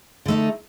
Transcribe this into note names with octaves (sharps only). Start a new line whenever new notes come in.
D3 A3 D#4